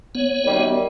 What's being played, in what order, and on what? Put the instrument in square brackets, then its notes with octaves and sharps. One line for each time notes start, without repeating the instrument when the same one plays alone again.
[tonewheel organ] B3 C#5
[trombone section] F#2 D#3 G3